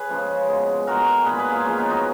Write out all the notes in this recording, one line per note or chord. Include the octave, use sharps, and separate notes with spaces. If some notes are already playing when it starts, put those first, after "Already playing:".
Already playing: G#4 B4 C#5
C#3 F3 G#3
B2 G#3
B2 G#3 F#4 A#4
A#2 G#3 G#4 B4
G#4 B4
F4 G#4
C#3 F3 G#3 C#4 F4
B3 D#4
D#4 F#4